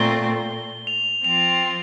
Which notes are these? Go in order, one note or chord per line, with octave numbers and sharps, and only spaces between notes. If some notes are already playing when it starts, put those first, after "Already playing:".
Already playing: A#2 A3 C4 F4 G7
F7
F3 C4 F4 F7